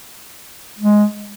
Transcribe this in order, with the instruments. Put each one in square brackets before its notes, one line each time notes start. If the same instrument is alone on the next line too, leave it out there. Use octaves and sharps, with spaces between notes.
[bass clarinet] G#3